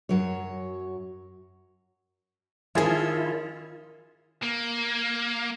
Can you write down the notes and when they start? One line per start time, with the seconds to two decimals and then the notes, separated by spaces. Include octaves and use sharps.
0.09 F#2 F#3 C#5
2.75 D#3 F3 C#4 E4 F4 G#4
4.42 A#3